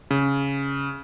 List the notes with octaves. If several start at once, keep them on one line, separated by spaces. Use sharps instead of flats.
C#3